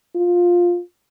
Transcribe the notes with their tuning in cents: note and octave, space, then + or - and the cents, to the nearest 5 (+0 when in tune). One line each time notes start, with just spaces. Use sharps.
F4 +10